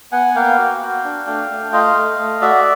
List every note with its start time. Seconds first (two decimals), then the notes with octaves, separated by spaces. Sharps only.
0.12 B3 F#5 G#5
0.35 A#3 F5 G5
0.58 F#4
0.82 F#4
1.04 D4
1.27 A3
1.50 A3
1.73 F4 D#5 F5
1.96 A3
2.19 A3
2.41 F#4 D5 E5